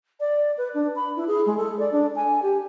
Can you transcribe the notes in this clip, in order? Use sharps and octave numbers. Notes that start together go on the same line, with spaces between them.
D5
B4
D4
B5
E4
G#4
G#3
A4
D5
D4
G#5
G4